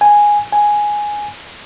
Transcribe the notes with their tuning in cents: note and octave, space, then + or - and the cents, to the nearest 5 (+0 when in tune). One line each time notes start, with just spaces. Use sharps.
G#5 -5
G#5 +0